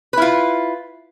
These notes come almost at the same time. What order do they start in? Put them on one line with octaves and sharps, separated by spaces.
B4 E4 F4